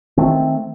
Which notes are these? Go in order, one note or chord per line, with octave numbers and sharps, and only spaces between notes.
D#3 A3 C4